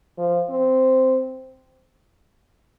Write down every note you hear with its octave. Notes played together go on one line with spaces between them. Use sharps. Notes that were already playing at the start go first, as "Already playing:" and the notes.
F3
C4